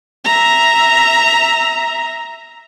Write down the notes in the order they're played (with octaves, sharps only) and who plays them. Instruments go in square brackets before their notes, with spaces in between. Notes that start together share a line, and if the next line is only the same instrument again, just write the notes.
[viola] E5 A#5